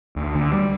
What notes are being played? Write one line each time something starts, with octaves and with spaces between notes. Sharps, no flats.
D2
D3
G3